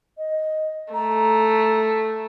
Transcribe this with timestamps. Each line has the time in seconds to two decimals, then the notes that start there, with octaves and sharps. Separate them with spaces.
0.18 D#5
0.94 A3 A#5